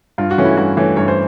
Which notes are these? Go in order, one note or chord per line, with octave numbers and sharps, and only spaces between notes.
G2 F4
F#4
E3 A3 C#4
E4
G2 F#4
E3 A3 C#4
G2 C#5
C5